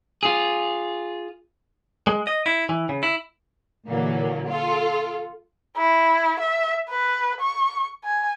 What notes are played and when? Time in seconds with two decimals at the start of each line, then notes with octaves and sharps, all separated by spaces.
0.23 F4 G#4
2.07 G#3
2.27 D#5
2.46 E4
2.69 E3
2.89 C#3
3.03 E4
3.88 A#2 D3 E3 F#3 A#3
4.48 F4 A4
5.77 E4
6.40 E5
6.90 B4
7.41 C#6
8.04 G#5